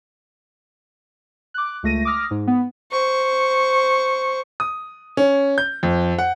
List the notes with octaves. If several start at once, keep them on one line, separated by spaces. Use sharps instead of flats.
D6 F#6
C#2 A3 A#6 D#7
D6 D#6 F6 A#6
G#2
B3
C5 C#6
D#6
C#4
G6
F2
F#5